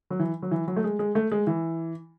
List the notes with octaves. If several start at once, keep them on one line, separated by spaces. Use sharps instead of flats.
F#3
E3
F#3
E3
F#3
A3
G#3
G#3
A3
G#3
E3